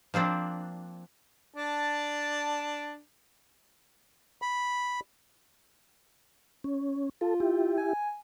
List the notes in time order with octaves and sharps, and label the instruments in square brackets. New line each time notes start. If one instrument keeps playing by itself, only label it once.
[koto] F3 A#3 C4 D4
[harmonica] D4 A5
[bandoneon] B5
[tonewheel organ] C#4
[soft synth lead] F4 [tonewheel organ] A4
[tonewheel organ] E4 G4
[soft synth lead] G#5